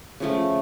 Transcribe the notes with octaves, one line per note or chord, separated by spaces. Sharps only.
C#3 F3 A3